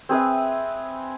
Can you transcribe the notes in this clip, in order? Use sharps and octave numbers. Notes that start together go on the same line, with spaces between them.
C4 G#4 B4 E5